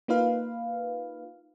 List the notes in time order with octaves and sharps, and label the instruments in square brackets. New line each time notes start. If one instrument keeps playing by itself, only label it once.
[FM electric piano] A#3 D#4 F4 B4 F5